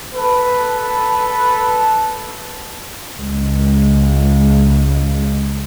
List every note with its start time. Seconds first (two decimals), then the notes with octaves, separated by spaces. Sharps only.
0.15 A4 B4
3.17 C#2 G#3